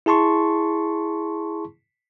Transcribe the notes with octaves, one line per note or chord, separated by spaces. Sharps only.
E4 G#4 A5 C6 C#6